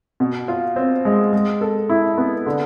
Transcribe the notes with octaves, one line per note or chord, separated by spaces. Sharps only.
B2
F4
C4
G#3
G#3
A4
E4
B3
D3